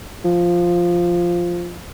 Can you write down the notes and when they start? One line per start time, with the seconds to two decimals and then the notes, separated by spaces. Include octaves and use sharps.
0.25 F3